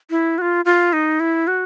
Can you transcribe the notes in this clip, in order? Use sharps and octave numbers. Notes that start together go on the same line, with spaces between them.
E4
F#4
F4
F4
D#4
E4
F#4